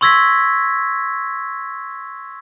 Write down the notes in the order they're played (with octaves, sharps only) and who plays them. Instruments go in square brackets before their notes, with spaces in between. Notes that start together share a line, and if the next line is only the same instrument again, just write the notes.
[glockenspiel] C6 C#6 E6 G#6 A#6 B6